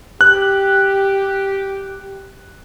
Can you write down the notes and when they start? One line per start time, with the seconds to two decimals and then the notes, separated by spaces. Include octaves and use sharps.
0.21 G4 F#6